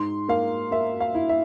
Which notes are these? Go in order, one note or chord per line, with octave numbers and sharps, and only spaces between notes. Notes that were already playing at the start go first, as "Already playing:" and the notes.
Already playing: G#2 C6
A#3 F5
A#3 E5
F5
E4
E5